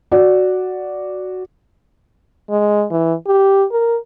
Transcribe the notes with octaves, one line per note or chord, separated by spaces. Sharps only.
F#4 D5
G#3
E3
G4
A#4